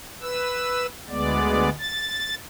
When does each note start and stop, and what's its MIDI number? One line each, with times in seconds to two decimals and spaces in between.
0.22 0.86 71
0.22 0.86 88
1.09 1.70 38
1.09 1.70 56
1.09 1.70 59
1.09 1.70 74
1.79 2.35 93